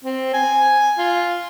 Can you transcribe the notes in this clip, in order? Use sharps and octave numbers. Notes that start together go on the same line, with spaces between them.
C4
G#5
F4